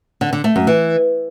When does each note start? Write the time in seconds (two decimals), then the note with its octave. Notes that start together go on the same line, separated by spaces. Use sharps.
0.21 D3
0.33 D3
0.44 A3
0.56 F#2
0.67 E3